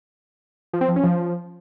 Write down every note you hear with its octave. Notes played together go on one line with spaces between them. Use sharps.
F3
C4
F3
C#4
F3